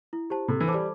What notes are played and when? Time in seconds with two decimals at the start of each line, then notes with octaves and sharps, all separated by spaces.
0.13 E4
0.30 G4 C5 A5
0.48 C3 A4
0.61 E3
0.68 C5 A5 D6
0.74 G3